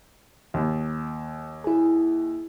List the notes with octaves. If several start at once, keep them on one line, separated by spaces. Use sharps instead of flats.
D#2
E4 G#4